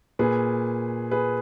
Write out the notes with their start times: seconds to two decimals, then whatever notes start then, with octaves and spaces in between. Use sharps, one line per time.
0.19 A#2 G#4 B4
1.11 G#4 B4